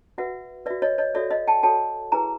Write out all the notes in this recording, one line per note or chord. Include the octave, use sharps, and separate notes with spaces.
F#4 B4 E5 F#5
F#4 B4 D5 E5
C#5 D#5
C#5 D#5
F#4 A4 C#5 D5 E5
D#5 F5
G5 A5
F#4 A4 C#5 G5 A5
E4 G#4 B4 G#5 A#5